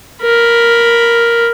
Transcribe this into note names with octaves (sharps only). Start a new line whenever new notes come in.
A#4 B5